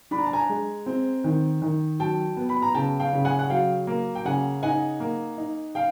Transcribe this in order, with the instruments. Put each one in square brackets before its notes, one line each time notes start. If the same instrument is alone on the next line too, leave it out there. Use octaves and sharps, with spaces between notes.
[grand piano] D4 B5
A#5
A5
G#5 A#5
G#3
C4
D#3
D#3
F#3 G5 A5
B3
B5
A#5
C#3 G5 A5
F5 G5
C#3
F#5 G#5
F#5
F#3 F5 G5
A#3
G5
C#3 F#5 G#5
D#4 F#5 G#5
A#3
D#4
F5 G5